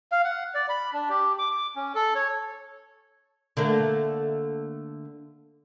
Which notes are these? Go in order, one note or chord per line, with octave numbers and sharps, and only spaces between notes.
F5
F#5
D5
B5
D4
G4
D6
D6
C#4
A4
C#5
D3 A3 A#3